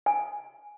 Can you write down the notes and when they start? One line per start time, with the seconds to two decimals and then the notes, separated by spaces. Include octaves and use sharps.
0.06 G#5